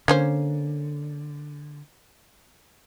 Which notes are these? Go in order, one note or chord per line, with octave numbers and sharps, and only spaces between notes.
D3 A#3 C#4 C5